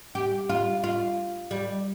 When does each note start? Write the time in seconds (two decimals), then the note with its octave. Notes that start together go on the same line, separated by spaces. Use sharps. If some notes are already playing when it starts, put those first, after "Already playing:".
0.15 G4
0.49 F4
0.84 F4
1.51 G3